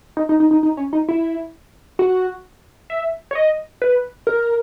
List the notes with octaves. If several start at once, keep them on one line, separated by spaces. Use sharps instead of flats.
D#4
D#4
D#4
D#4
D#4
C#4
D#4
E4
F#4
E5
C#5
D#5
B4
A#4